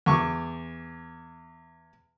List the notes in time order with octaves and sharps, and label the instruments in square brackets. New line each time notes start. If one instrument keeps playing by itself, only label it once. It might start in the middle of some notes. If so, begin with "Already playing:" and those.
[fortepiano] E2 C#6 D6